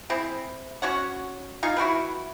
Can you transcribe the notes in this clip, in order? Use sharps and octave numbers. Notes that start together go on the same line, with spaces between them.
C4 E4 G#4
C#4 F#4 C#5 F#5
D#4 F4 F5 G#5
E4 F#4 G4 B4